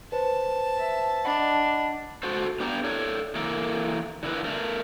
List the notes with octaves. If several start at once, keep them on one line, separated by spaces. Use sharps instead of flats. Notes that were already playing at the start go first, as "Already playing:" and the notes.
B4 C5 A5
E5
D4 D#5 F#5 B5
F#4 A4 C5
B3 D4 G4 A4 A#5
A4 C#5 D5
E3 A#3 A4 A#4
D3 E4 A#4 B4
A3 A#4